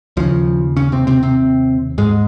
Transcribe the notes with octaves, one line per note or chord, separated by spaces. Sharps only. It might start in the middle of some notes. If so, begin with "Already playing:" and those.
D#2 C#3 F3
C#3 C#4
C3 C4
C3 C4
C3 C4
G#2 G#3